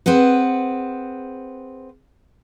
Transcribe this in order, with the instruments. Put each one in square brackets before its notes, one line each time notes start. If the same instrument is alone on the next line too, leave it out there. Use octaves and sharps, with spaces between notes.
[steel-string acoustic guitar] C4 G#4 B4 F#5